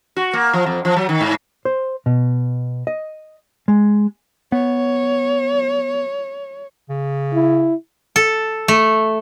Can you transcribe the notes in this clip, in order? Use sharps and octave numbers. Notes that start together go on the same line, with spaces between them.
F#4
A#3
F3
F2
F3
F#3
D#3
G#2
C5
B2
D#5
G#3
B3 C#5
C#3
E4
A4
A3